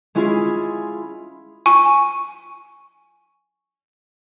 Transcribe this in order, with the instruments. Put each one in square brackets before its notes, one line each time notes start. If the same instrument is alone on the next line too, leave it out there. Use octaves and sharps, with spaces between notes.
[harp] G#3 C#4 E4 F4 G#4
[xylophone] G#5 [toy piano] C#6